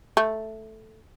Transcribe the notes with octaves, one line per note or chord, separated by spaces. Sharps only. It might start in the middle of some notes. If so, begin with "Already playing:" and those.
A3